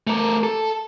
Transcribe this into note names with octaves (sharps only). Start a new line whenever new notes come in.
A3 A#4
A4